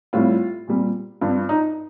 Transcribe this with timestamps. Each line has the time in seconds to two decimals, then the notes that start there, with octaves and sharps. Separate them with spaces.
0.13 A2 G3 C4 F4
0.68 A#2 G3 C4
1.21 G2 F3 C4 F4
1.49 D#4